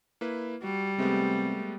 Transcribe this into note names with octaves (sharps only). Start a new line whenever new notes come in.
A#3 E4 B4
G3 F#4
C3 G#3 A3 B3